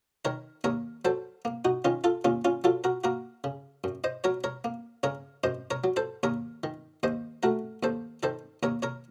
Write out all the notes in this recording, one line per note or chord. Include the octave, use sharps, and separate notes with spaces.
D#3 A#4 C#5
D#2 A#4 C#5
F#3 A4 C5
A#3
D#4 F#4
D#3 C#4 F4
F4 A4
D#2 C#4 F4
C#4 F4
F#3 F4 A4
F#4 A#4
A#3 F#4 A#4
C#3
F#2
C5 D#5
F#3 A#4 C#5
A#4 C#5
A#3
C#3 A#4 C#5
F#2 C5 D#5
A#4 C#5
F#3
A4 C5
D#2 A#4 C#5
D#3
D#2 C5 D#5
A3 F#4 A#4
D#2 A4 C5
D#3 A4 C5
D#2 A#4 C#5
A#4 C#5